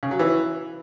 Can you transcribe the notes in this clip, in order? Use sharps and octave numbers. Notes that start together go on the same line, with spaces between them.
C#3
F#3
E3